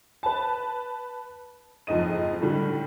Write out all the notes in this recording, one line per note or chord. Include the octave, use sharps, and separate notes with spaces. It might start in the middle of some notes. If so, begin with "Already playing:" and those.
B4 A5
F#1 F2 G#2 D#5 D#7
A2 D3 G3